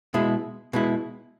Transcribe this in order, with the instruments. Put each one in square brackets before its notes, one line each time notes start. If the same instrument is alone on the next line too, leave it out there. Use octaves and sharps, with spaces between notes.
[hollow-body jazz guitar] B2 G#3 E4
B2 G#3 E4